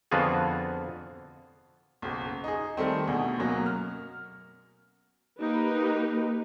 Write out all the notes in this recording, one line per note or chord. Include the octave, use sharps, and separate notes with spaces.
F2 D3 B3 F4 F#4 G#4
F#1 B1
D#4 G#4
D#3 G3 A3 C4
D2 B2 G#4
F#2 B2 F#3 A#3 C#4
F6
A#3 D#4 G4 B4